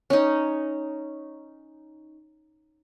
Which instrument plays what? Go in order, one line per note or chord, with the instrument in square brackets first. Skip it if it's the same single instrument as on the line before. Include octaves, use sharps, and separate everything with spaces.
[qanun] C#4 D#4